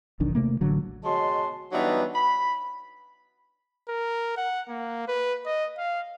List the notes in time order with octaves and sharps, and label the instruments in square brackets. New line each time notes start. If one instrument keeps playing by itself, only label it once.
[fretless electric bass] E1 B1 D#3 D4
C3 A3 A#3
A1 D3 F#3
[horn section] B2 G#3 F#4 C#5 A5 C6
E3 F#3 G3 B3 D4 D#4
B5
[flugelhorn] A#4
F#5
A#3
B4
D#5
F5